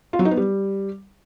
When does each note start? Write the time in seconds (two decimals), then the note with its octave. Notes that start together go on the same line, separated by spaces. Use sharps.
0.13 F4
0.19 F#3
0.25 D#4
0.31 B3
0.37 G3